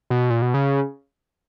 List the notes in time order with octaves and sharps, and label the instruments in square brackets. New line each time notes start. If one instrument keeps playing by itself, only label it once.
[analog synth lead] B2
A#2
B2
C#3